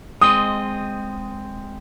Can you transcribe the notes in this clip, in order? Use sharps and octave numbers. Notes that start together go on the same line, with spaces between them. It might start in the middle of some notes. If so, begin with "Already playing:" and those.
G#3 C4 D#5 D#6